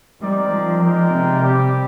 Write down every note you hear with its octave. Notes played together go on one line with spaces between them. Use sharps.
G3 C4 D#4 A#4 D5
F3
G#3 D#4 A#4 D5 G5
C3
G3 C4 G4